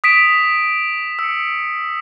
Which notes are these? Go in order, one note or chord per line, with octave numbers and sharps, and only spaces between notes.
D#6 B6 D7 E7
E6 C#7